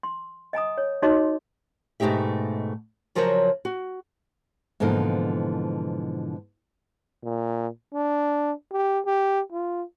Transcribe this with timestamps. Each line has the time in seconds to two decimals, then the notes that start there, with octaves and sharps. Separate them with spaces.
0.03 C6
0.53 D#5 G#5 A#5 D#6
0.78 C#5
1.02 D#4 F#4 C#5 D#5 C6 D6
2.00 G#2 B2 A3 D#4 G4 E5
3.15 C#3 F3 F#3 A#4 C5 C#5
3.65 F#4
4.80 G#2 B2 D3 E3 F3 A#3
7.23 A#2
7.94 D4
8.72 G4
9.06 G4
9.52 F4